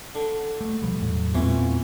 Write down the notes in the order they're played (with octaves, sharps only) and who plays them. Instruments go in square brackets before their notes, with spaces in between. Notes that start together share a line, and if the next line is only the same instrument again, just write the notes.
[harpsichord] D3
[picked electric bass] A3
B2 F3 G3
E2 A2 F#3
[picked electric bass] E2 A#2 G#3 [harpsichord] E3 [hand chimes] B3 C4 F4